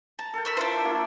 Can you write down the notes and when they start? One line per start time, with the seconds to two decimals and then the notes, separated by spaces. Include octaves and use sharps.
0.19 A5 A#5
0.34 A4 A#4 G5
0.45 B5 E6 F6
0.57 D4 E4 F4 C5
0.73 D5 E5
0.85 A#3 E4 F#4